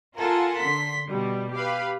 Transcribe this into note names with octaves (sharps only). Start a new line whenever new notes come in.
F4 A4 A#4 F#5 G#5 A5
D3 C6 B6
B2 G3
G4 B4 F5 B5